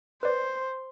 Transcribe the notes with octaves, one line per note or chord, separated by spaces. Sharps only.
B4 C5 D5